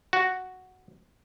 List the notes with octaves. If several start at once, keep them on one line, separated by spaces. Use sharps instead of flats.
F#4